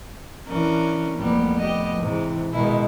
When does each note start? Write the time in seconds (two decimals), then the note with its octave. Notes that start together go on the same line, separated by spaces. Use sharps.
0.47 E3 C#4 D4 A#4
1.18 F1 G3 A#3 B3
1.58 G4 D#5
2.01 G#2 C3 E3
2.53 B2 D#3 G#3 E4